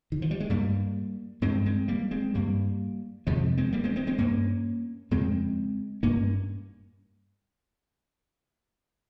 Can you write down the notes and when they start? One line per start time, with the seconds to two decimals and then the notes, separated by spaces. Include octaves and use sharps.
0.12 D#3
0.22 F3
0.31 G3
0.40 G#3
0.50 G2 G3 A#3
1.42 G2 G#3 C4
1.66 G#3 C4
1.88 G3 A#3
2.11 G#3 C4
2.34 G2 G3 A#3
3.27 F2 C3 F3 G#3
3.57 G#3 C4
3.72 G3 A#3
3.84 G#3 C4
3.96 G#3 C4
4.07 G#3 C4
4.18 G2 A#3 C#4
5.11 F2 C#3 G#3 C4
6.03 G2 A#3 C#4